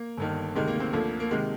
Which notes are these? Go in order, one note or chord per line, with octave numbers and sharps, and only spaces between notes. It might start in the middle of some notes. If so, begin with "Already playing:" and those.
Already playing: A#3
G1 G2 D#3
D2 C3 D#3 G#3
A#3
C4
D2 D3 F3 A#3
A#3
C3 D#3 G#3